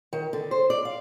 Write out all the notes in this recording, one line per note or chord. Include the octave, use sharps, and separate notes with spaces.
D#3
D3
C5
D5
F5